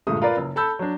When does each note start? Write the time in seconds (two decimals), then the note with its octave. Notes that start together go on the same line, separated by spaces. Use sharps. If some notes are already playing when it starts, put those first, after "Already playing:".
0.07 D2 G2 A#2 G#3 A3 D#6
0.22 F4 A#4 B4 D5
0.37 F#1
0.56 A4 A5 B5 E6 G6
0.79 F#3 D4